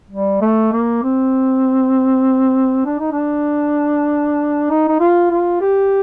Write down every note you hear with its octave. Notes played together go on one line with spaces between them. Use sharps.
G3
A3
A#3
C4
D4
D#4
D4
D#4
D#4
F4
F4
G4